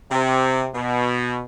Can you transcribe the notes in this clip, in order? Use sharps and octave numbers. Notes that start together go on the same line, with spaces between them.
C3
B2